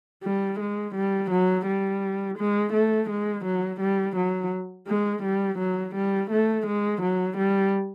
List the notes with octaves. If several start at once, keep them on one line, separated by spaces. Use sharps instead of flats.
G3
G#3
G3
F#3
G3
G#3
A3
G#3
F#3
G3
F#3
G#3
G3
F#3
G3
A3
G#3
F#3
G3